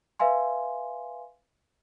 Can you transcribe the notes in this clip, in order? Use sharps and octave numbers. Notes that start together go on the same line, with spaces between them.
B4 E5 F5 G#5 C6